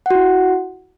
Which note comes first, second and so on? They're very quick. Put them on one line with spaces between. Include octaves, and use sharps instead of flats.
F#5 F#4 E4